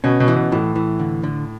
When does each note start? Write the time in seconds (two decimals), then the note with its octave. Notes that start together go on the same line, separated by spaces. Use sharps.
0.04 B2 C#4
0.20 B2
0.28 E3
0.36 B2
0.52 A2 E3
0.75 E3
1.00 D3
1.23 D3